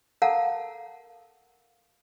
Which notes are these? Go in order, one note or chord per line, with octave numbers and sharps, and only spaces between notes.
A4 A#4 F5 F#5 A5 A#5